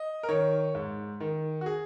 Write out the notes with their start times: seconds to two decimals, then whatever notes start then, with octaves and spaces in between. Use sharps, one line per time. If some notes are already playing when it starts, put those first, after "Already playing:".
Already playing: D#5
0.23 A#4
0.29 D#3 C#5
0.75 G#2
1.20 D#3
1.61 F#4
1.66 G#4